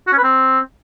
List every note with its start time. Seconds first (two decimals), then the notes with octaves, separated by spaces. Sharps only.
0.07 F#4
0.13 C#4
0.18 B4
0.23 C4